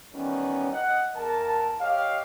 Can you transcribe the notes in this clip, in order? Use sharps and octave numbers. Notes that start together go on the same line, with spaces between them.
D#3 E3 G3 B3 C#4
D#5 F#5
E2 A#4 A5
G4 C#5 D#5 F5